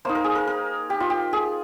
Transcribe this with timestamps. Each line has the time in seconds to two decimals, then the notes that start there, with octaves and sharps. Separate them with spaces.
0.05 A#3 D#4 C5
0.15 A#4
0.24 G#4
0.35 A#4
0.47 A#4
0.90 G4
1.00 F4
1.10 G4
1.33 G#4